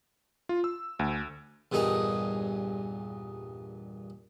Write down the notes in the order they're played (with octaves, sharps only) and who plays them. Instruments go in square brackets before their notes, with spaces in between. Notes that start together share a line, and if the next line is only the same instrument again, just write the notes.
[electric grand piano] F4
E6
D2
[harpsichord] E2 G2 A#2 D#4 G#4